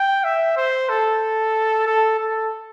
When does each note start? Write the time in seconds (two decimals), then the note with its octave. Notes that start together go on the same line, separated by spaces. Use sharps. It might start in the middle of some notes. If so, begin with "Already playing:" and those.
Already playing: G5
0.24 E5
0.57 C5
0.90 A4
1.87 A4
2.19 A4